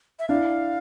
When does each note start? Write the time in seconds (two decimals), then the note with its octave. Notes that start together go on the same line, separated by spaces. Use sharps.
0.19 E5
0.28 D4 E4 F5